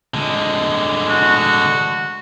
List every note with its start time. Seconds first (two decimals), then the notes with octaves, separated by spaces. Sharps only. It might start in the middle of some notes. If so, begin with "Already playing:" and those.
0.14 D3 G#3
1.09 F#4